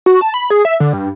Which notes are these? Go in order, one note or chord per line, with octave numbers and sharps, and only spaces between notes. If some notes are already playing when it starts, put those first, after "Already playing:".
F#4
A5
B5
G#4
E5
D3
G2